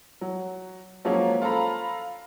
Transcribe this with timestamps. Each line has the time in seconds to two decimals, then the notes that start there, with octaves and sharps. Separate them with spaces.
0.21 F#3
1.05 F3 F#3 G#3 A#3 C#4
1.42 F4 A4 C5 A#5 B5